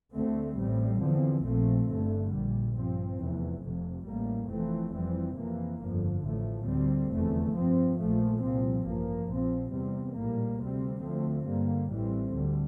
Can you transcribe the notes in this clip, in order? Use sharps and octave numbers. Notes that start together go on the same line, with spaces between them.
D2 D3 A3 C4
A1 A2 G3 C4
E2 D3 F3 C4
A#1 A#2 F3 A3 C4
G1 G2 D3 A3
A#1 A#2 G3
G2 F3 C4
F1 E2 E3
F1 F2 C3
A1 A2 G3 A#3
F1 F2 E3 A3 C4
F2 E3 G3 C4
F2 C3 E3 A#3
G1 F2 D3 F3
A1 A2 F3 A3
D2 D3 G3 C4
F1 E2 D3 A3
G2 F3 C4
A#1 A#2 F3 A3
C2 A#2 F3 C4
A1 G2 F3 A#3
A#1 A#2 F3 C4
E2 C3 G3 C4
A#1 A2 G3 A#3
D2 C3 G3 C4
D2 D3 F3 A3 C4
G2 D3 G3 A#3
A1 A2 E3 G3 C4
D2 D3 G3